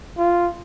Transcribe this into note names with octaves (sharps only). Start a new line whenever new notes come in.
F4